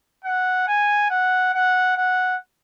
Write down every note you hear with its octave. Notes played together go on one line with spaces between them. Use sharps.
F#5
G#5
F#5
F#5
F#5